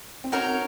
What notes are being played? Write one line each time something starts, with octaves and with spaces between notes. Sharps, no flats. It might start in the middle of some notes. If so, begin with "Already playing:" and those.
C4
C#4 D#4 F#4 A#4 C#5